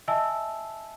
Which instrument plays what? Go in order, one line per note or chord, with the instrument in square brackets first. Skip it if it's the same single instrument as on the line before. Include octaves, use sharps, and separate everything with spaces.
[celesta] D#5 E5 G#5 A5 E6